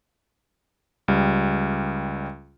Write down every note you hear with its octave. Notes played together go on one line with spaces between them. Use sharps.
C#2 G3